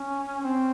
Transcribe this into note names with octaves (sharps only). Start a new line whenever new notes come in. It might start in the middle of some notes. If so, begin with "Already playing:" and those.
Already playing: C#4
C4